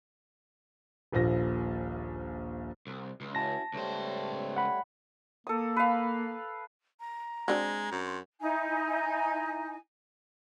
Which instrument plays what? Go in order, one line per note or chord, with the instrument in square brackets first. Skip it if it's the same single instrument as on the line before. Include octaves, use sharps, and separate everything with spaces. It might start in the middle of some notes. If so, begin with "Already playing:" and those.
[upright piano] D#1 A#1 F3 A#6
[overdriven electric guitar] C2
C#2
[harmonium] C#4 E4 F#4 [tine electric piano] A5 A#6
[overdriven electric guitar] C#2 C5 [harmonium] G3 A3 C#5
[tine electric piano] F#5 B5
[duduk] A#3 [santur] A4 D#6
[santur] B4 F5
[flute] A#5
[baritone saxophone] G#3 [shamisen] C4 D4 F#4
[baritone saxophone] F#2
[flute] C6
[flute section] D#4 E4 G#5